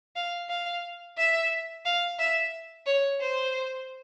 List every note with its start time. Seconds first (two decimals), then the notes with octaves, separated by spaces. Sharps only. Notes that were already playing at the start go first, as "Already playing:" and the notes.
0.16 F5
0.49 F5
1.17 E5
1.86 F5
2.19 E5
2.86 C#5
3.21 C5